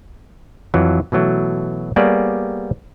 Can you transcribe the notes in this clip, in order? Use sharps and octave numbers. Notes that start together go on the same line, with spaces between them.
F2 E3 F#3
B2 E3 F#3 A3
G3 A#3 B3 G#4 C#5 D5